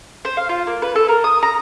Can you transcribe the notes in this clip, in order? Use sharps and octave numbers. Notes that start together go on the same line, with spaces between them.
C5
F5
F4
A#3
B4
A4
A#4
D#6
A#5